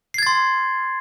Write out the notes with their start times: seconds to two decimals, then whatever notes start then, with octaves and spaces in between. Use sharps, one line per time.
0.14 C7
0.18 G#6
0.22 A6
0.27 C6